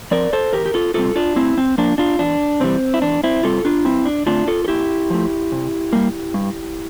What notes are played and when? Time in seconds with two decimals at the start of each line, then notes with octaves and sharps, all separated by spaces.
0.11 F3 C4 A#4 D5
0.33 A4 C5
0.53 E2 G4 A#4
0.66 G4
0.74 F4 A4
0.94 C3 G3 C4 F4 A4
1.16 D4 F4
1.36 A2 C4 E4
1.58 C4
1.78 F3 A#3 D4
1.98 D4 F4
2.19 E2 D4
2.60 C3 E3 G3 C4
2.94 E4
3.02 E2 D4
3.24 C4 E4
3.43 C3 G3 C4 F4 A4
3.65 D4 F4
3.85 G2 C4 E4
4.05 D4
4.26 D3 A3 C4 D4 F4
4.47 F4 A4
4.65 A4
4.68 A#2 E4 G4
5.10 F3 A3
5.52 C3
5.93 G3 A#3
6.34 G2